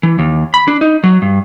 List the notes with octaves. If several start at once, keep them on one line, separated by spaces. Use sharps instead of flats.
E3
D#2
B5
D4
D#4
F#3
G2